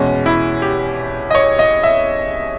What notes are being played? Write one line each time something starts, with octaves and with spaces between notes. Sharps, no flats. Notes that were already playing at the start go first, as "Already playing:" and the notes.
Already playing: E2 B2 G#3 C#4
E4
G4
D#5
C#5
D#5
E5